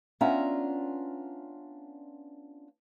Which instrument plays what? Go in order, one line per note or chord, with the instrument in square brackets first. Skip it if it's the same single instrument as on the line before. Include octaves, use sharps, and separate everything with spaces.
[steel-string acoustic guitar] B3 C#4 D4 F4 E5 A#5